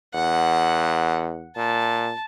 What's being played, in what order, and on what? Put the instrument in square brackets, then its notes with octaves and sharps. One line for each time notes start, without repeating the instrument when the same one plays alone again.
[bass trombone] E2 [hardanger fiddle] F#5
[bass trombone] A#2 [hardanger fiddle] A5